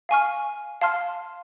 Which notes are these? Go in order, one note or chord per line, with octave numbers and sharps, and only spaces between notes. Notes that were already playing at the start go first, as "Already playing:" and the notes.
F5 G#5 C#6 F6
F5 A5 C6 F6